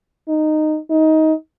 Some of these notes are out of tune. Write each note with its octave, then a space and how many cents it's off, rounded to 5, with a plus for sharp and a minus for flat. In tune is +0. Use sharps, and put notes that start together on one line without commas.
D#4 -15
D#4 +20